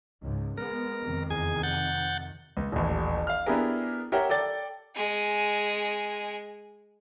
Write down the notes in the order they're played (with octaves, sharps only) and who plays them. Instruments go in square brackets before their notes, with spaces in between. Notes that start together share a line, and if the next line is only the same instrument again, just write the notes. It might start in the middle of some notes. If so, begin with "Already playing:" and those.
[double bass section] C#2 G#2
[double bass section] G#3 B3 [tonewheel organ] A#4
[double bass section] F2 C3 D#3
[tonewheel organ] E2 G#4 G#5
F#5 G6 A6
[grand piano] C#2
D#1 A1
F5 F6
B3 D4 E4 G4 G#4 A#4
G4 A#4 C#5 E5 F#5 G5
A4 D5 G5 A6
[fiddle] G#3 G#5